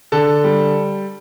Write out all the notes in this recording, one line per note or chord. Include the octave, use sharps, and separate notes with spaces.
D3 A4 A5
G3